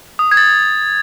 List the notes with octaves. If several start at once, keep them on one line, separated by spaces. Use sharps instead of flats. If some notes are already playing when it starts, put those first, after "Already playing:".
D#6
G#6
A6